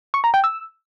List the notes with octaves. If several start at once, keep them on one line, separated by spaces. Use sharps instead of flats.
C#6
A#5
G5
E6